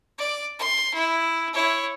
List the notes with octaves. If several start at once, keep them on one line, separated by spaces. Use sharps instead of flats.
D5
C6
E4
E4 C#5